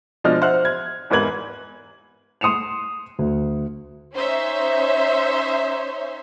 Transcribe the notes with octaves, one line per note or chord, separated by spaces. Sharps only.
B2 F3 G#3 D4 D#5 F6
C5 E5 F#5 F6 F#6
G#6
E2 G#2 A#4 B4 G#6 F#7
C6 D#6 C#7 E7 F7
D2
C#4 D#4 C5 C#5 E5